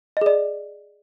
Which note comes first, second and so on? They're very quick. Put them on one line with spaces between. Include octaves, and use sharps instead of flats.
D#5 G#4 D5